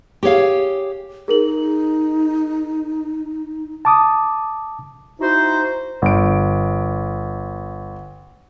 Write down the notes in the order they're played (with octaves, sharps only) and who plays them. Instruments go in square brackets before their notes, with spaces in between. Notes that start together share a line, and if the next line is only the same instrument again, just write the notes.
[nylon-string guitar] G4 G#4 C#5 F5
[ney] D#4 [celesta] G#4 A#4 F#7
[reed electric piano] A5 D6 D#6
[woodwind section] D#4 E4 F#4 C5
[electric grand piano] G1 D7